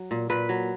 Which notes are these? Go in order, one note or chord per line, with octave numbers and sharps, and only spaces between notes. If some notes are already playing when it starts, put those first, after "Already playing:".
Already playing: F#3
A#2
A#2 B4
F#3